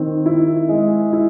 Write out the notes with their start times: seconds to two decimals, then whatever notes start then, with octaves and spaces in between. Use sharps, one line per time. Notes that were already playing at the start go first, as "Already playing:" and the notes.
Already playing: D#3 C4
0.26 E4
0.69 G#3
1.13 E4